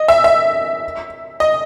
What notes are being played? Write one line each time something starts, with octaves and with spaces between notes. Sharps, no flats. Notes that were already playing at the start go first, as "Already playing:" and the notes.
Already playing: D#5
E5
E5
D#5